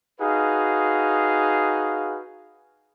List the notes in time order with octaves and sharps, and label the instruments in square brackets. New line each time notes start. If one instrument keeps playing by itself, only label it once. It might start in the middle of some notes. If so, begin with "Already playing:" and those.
[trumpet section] D#4 F#4 G#4 B4 F5